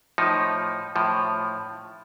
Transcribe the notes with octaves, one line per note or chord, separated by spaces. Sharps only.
A2 F3 D#4
A2 F3